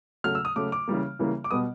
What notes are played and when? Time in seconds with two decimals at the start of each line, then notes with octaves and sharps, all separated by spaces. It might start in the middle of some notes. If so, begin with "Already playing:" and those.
0.24 C#3 F#3 A3 F6
0.35 E6
0.45 D#6
0.56 C#3 F#3 A3 D6
0.72 D6
0.88 C#3 E3 G3 A#3
1.19 C#3 E3 G3 A#3
1.44 D6
1.51 B2 G3 B3 D#6